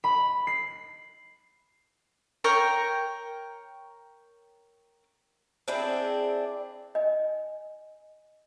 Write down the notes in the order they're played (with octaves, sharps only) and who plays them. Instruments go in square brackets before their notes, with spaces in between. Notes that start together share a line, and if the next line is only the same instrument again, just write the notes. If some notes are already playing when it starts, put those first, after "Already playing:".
[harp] B5
C7
[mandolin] A#4 C#5 G5 A#5
[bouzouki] C4 D4 E4 G#4
[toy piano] D#5 G#5